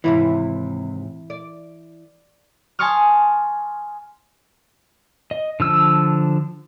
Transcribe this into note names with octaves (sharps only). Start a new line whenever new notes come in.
D#2 G#2 C3 E3 E4
D5
G#5 A5 C6 C#6 D#6 F6
D#5
D3 F3 E6